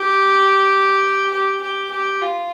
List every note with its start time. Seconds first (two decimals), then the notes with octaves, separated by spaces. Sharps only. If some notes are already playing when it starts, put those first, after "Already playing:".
Already playing: G4
1.31 G4
1.61 G4
1.91 G4
2.21 F4